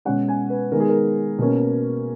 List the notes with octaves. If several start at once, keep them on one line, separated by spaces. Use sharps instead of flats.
B2 G#3 C#4 F#5
G#5
B4
D#3 G#3 B3 A#4
G#4
A#4
B2 A#3 C#4